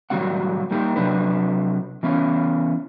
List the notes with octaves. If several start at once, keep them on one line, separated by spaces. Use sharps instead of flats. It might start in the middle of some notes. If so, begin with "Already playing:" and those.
A2 D#3 F#3 G3 C4 F#5
G3 A#3 D#4 G4
C3 F#3 D4 B4
E3 B3 C#4